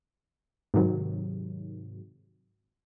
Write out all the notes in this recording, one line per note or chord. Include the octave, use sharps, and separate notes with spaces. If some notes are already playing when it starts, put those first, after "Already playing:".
G#2 C3 D#3 F#3